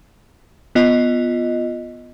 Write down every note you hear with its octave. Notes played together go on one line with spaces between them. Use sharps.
B3 F4 D#5